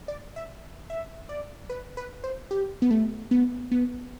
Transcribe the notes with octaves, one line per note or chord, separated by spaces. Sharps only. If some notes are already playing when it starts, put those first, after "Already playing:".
D5
E5
E5
D5
B4
B4
C5
G4
B3
A3
B3
B3